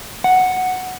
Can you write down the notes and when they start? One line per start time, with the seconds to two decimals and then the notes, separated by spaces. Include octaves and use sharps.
0.24 F#5